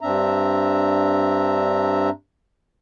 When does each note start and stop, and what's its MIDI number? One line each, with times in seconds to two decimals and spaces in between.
0.01 2.10 43
0.01 2.10 60
0.01 2.10 62
0.01 2.10 76
0.01 2.10 82